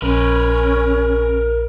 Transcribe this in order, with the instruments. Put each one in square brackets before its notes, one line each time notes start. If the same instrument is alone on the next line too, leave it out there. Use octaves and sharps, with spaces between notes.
[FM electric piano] A#1 [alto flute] C#4 [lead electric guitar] A#4 B4